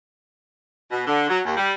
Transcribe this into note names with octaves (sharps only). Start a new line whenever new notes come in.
B2
D3
F#3
D#2
G3